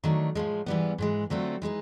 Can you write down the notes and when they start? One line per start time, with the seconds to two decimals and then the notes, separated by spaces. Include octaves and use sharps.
0.04 D#3 F#3 A3 D4
0.35 A2 F3 G#3
0.66 G#2 E3 G3 B3
0.98 G#2 E3 G#3
1.30 D3 F#3 A3 C4 F4
1.62 E3 G#3 B3 D#4